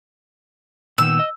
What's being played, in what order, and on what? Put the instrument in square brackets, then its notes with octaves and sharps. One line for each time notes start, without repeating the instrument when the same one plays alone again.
[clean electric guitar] A#2 D#3 B3 [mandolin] E6
[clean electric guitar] D#5